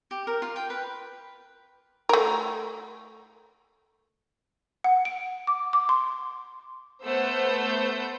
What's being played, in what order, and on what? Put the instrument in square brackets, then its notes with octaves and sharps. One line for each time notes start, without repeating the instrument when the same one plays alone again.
[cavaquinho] G4
A#4
F4
G5
B4
[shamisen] A3 A#4
[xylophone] F#5
D7
D6
D6
C6
[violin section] A3 B3 C5 F#5 E6 G6